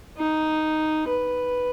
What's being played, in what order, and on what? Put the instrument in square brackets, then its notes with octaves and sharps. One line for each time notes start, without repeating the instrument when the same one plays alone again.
[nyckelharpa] D#4
B4